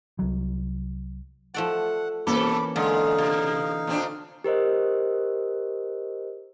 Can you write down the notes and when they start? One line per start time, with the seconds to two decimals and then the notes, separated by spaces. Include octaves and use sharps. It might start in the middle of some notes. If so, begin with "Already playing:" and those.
0.19 C2 F#3
1.54 F3 A3 D5 F#5
2.27 B2 E3 A#3 C#4 A4 B5 D6
2.76 D3 G#3 D#4 F5
3.18 C3 F4
3.87 A#2 C4 D4
4.44 G4 A#4 C5 D#5